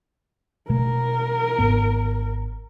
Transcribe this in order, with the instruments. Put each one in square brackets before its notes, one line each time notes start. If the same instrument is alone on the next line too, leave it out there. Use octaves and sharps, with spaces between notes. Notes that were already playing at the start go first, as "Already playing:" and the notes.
[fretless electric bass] B2 G#3 A3 [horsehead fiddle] A#4
[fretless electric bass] G#1 G#2 B3